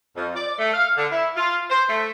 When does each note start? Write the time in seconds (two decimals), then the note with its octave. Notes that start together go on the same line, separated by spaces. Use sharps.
0.16 F2
0.35 D5
0.58 A3
0.73 F5
0.97 D3
1.11 E4
1.36 F4
1.70 C5
1.88 A3